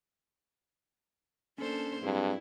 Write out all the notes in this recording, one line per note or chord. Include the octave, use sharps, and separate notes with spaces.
A#3 C#4 D4 A4 C5
G2 F#3 C4 E4 G#4